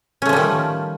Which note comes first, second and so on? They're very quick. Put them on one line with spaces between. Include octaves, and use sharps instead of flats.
C#4 A3 F3 G3 D#3